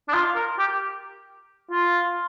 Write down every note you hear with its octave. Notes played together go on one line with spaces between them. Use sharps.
D4
F4
A#4
G4
F4